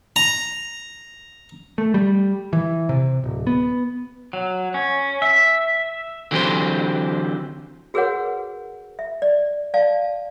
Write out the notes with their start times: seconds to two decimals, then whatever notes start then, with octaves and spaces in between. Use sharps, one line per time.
0.16 A#5
1.78 A3
1.94 G3
2.53 E3
2.89 C3
3.24 D1
3.47 B3
4.33 F#3
4.74 C#4
5.22 E5
6.31 D3 E3 F#3 C4 G4 C5
7.94 F#4 G#4 A#4 B4 C#5 F#5
8.99 E5
9.22 D5
9.74 D5 F5 A5